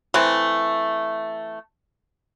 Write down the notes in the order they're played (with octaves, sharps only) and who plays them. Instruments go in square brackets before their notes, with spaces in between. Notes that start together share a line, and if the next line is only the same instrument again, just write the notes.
[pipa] E3 A3 C4